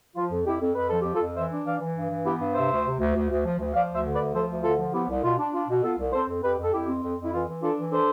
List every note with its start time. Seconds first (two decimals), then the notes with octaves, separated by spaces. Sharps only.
0.15 F3 F4
0.31 F2
0.45 F2 E4 G4
0.60 F2
0.75 F2 B4
0.89 F3 A4
1.01 F2 G4
1.14 F4 A4
1.20 F2
1.35 E3 C5 E5
1.51 D4
1.64 E3 D5 F5
1.80 E3
1.95 G2
2.10 E3
2.24 B3 E4 G4
2.39 G2
2.54 C3 C5 E5
2.70 D2
2.85 C3
2.99 D2
3.15 D2
3.29 D2
3.44 F3
3.58 D2
3.74 F3 D5 F5
3.89 D2 C5 E5
4.03 D3
4.13 B4 D5
4.18 D2
4.34 F3 A4 C5
4.49 D2
4.63 D3 F4 A4
4.78 F3
4.93 B3 E4 G4
5.09 C2
5.22 B2 F4
5.38 D4
5.53 D4 F4
5.68 B2
5.83 B3 F4 A4
5.97 C2
6.12 C4 A4 C5
6.27 F2
6.42 F2 G4 B4
6.57 F2
6.63 A4
6.72 F2 E4 G4
6.88 C4
7.02 F2
7.17 F2
7.25 E4
7.32 E3 F4
7.47 E3
7.62 D4 F4 A4
7.77 E3
7.91 D4 A4 C5